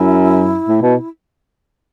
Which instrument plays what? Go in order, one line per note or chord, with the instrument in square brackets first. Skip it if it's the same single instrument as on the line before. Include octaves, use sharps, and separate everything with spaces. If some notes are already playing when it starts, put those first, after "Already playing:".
Already playing: [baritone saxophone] F#2 [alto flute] E4
[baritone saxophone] A2
B2